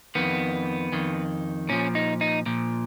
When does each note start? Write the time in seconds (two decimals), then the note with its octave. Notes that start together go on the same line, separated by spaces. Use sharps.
0.15 F2 D#3 B3
0.92 F2 D#3
1.69 A#2 F3 C#4
1.95 D#4
2.21 D#4
2.46 A#2 F3